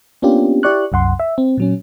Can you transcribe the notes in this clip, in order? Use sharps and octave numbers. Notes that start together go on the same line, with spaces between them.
A#3 B3 C#4 D4 F4 G4
E4 G4 D5 C#6 F#6
C2 F#2 F#5 C6
E5
C4
A#2 F#3 C#4